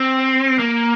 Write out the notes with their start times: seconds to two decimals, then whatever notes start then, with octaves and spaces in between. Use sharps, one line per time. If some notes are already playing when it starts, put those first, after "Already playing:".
Already playing: C4
0.59 A#3